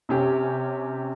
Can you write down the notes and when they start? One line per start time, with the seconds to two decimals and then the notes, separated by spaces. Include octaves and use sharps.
0.09 C3 C#4 G4